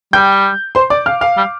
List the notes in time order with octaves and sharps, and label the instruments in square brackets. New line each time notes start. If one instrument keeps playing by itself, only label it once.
[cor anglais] G3 [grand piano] G5 G6
[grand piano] C5 C6
D5 D6
F5 F6
F5 F6
[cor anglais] G3